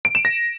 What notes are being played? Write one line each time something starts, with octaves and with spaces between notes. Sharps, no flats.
D7
E7
A#6